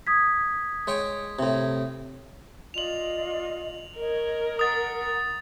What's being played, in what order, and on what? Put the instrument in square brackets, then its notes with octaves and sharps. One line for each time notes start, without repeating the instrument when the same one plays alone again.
[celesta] D#6 G#6 B6
[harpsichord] G#3 C#5 G5
A2 C3
[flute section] F4 D5 D#5 [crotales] F7 F#7
[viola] A#4 [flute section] C#5 D#5
[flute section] F#5 A#5 [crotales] D#6 A6